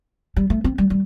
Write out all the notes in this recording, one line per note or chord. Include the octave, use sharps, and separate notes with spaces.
G3
A3
C4
G3
G3